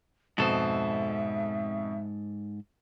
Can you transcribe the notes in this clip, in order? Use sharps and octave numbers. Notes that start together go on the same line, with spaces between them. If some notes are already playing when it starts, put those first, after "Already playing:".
F2 G#2 B2 A4 C5 E5